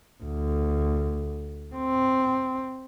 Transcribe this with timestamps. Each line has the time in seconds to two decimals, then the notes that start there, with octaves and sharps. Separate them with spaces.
0.23 D2
1.76 C4